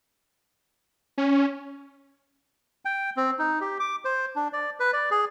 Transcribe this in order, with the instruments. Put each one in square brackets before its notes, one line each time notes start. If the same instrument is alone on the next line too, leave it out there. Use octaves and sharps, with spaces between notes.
[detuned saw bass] C#4
[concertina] G5
C4
D#4
G4
D6
C5
D4
D5
B4
D5
G#4